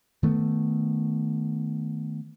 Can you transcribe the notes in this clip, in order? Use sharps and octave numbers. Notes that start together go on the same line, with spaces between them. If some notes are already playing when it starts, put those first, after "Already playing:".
D#3 A3 B3